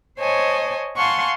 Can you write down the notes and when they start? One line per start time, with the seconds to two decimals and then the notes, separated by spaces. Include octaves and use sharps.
0.20 C5 C#5 D#5 G#5 A5
0.98 F5 F#5 G#5 A5 C6 C#6